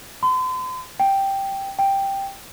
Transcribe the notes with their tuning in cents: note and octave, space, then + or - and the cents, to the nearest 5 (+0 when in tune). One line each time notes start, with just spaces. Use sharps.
C6 -45
G5 +0
G5 +5